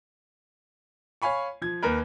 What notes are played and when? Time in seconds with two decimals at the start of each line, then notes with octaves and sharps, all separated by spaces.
1.22 C#5 F5 G#5 B5 C#6
1.62 F3 G#6
1.83 D#2 A#4 B4